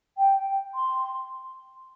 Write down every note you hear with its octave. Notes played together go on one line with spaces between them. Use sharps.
G5
C6